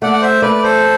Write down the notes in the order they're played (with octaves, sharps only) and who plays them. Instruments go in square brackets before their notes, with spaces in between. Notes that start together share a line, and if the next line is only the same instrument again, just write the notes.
[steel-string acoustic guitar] A3 [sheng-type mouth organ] D5 F#5
[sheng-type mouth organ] F#5
C5 E5
[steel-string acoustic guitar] A3 [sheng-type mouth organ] B4 D5
[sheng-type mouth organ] D5
A4 C5